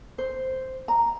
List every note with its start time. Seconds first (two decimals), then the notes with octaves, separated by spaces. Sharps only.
0.18 C5
0.88 A#5